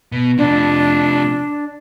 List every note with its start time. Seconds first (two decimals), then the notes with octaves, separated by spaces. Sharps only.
0.12 B2
0.38 C3 F3 D4